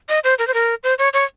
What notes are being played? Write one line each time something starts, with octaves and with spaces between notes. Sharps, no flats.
D#5
C5
A#4
C5
A#4
C5
C#5
C#5